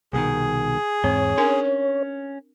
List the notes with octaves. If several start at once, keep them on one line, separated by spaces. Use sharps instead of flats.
C2 B2 D#3 G#4
E2 G#2 C4 C#5
C#4 D4 A#4 G#5